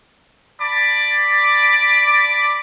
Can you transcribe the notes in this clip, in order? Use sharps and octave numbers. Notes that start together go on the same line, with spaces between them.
D5 A5 B5 D6